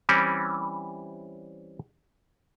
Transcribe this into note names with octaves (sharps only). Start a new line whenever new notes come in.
E3 G3 C4 C#4 E4